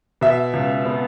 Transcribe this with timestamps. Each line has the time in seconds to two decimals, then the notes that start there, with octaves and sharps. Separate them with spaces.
0.21 B2 E5
0.53 C#2
0.85 B3